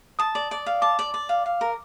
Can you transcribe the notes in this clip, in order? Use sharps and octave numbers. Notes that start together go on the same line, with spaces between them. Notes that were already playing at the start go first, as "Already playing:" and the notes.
A5 D#6
D5
D5
F5
A5 D6
D5
D5
F5
F5
A#4